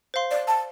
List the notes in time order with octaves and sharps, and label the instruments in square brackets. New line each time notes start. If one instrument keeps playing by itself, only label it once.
[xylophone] C5 F5 C6
[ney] D5
A5